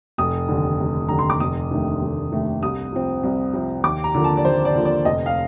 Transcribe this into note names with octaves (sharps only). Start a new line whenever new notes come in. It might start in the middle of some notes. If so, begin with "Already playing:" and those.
F1 D#6
D#2 D3
F1
D#2 D3 A#5
C6
D6
F1 D#6
D#2 D#3 A3 D4
F1
D#2 D#3 A3 D4
C2 D#6
C3 F3 C4
C2
C3 F3 C4
D#2 D6
A#5
D3 F3 A#3
A5
D5
D#2 C5
D5
D3 F3 A#3
D5
F1 D#5
F5